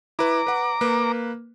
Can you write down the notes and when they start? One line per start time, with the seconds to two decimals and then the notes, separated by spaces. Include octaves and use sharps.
0.19 E4 B4 A#5 D6
0.47 B4 F#5
0.81 A#3 B4